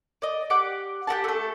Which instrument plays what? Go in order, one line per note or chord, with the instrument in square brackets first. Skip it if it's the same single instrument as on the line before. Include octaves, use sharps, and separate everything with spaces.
[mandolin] D5 D#5
G4 F#5 D6
G4 A#4 F#5 A5
A3 A4